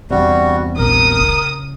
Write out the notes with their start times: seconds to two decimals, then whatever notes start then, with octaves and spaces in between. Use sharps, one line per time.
0.11 E2 G2 C3 G3 F#4
0.78 A#1 A#4 D#6
1.21 C#3